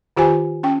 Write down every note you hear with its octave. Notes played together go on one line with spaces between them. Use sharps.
D#3 F4 G4 C5 G#5
C#4 G5